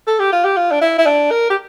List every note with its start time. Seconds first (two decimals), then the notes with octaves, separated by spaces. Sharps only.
0.07 A4
0.19 G4
0.32 F4
0.44 G4
0.57 F4
0.71 D4
0.82 E4
0.98 E4
1.06 D4
1.31 A#4
1.50 G4